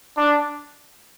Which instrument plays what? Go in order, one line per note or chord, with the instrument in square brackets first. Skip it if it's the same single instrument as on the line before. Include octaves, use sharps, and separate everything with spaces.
[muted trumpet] D4